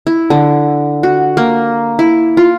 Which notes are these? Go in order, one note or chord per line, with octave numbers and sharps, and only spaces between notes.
E4
D3
F#4
A#3
E4
F4